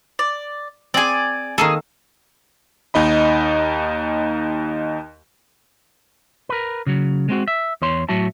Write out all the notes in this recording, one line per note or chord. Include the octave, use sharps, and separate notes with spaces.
D5
C4 G#4 D5 G#5
D#3 A#3 G#4 A4
D#2 D#4 D#5 B5
A#4 B4
C#3 F#3
G#3 C4 F#4
E5
E2 C#5 C6
A2 F#3 F#4 E5 A5